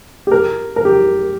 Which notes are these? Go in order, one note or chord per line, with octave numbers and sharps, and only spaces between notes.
G4
A#4
A#4
G4